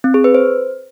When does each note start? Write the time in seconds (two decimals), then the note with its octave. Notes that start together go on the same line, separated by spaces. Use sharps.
0.04 C4
0.14 G#4
0.24 B4
0.34 C5